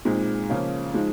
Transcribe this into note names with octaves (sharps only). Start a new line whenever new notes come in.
A#2 G#3 C4 D#4
C#3 F3 A#3 C#4 F4
F3 G#3 D#4